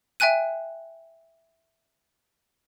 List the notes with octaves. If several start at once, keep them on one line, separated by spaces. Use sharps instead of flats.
E5 G5 G#5 F#6 D#7